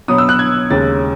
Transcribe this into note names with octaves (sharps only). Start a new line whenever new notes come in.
B2 F#3 B3 D#6
E6
F#6
G#6
D#2 C#3 G#3 C#4 A6